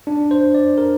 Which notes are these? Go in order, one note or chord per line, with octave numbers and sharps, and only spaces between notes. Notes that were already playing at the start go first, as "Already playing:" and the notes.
D4
C5
D5
A#4